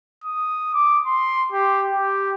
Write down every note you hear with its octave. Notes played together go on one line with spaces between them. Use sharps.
D#6
D6
C6
G4
G4